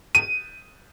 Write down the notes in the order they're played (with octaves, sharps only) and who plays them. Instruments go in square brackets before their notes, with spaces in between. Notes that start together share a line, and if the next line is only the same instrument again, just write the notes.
[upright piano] D#7